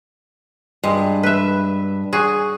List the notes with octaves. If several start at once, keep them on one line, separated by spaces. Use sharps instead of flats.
G2 G#3
B4 E5
F#4 G#4